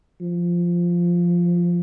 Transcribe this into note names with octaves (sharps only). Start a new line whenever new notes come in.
F3